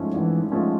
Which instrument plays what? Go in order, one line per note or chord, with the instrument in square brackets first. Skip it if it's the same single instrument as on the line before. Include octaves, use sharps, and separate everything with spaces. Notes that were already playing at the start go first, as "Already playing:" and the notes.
Already playing: [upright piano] G#1 G#2 F3 A3 C#4
[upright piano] G#1 [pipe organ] E3
[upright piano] G#2 F3 A3 C#4